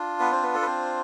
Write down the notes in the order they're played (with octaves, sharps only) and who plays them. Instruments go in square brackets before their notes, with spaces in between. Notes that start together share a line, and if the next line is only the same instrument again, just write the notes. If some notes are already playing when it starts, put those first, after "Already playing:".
Already playing: [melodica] D4 F4
B3 B4
C4 C5
B3 B4
A4
B4
C4 C5